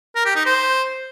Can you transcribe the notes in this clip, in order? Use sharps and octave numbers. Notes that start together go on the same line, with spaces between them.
A#4
G4
D#4
C5